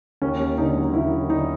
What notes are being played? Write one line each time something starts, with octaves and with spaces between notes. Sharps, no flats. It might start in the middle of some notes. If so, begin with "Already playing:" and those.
D#2 C#4
D#2
D3 D#4
F#3
D#2 E4
D#2
D3 D#4